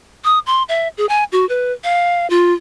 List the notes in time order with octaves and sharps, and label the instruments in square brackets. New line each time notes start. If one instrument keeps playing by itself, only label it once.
[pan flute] D#6
C6
E5
G#4
G#5
F#4
B4
F5
F4